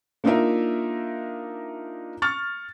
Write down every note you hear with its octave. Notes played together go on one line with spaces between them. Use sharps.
A#3 D4 D#4 F4 A#4 E5
C#6 F6 A6